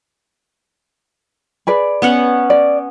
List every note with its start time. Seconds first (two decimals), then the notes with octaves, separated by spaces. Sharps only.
1.67 G#4 B4 D5
2.02 B3 C#4 F#5
2.50 D5